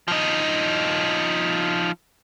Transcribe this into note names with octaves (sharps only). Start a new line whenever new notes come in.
F3 D#4